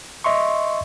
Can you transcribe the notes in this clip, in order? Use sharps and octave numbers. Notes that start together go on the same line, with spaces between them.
D#5 E5 C6 C#6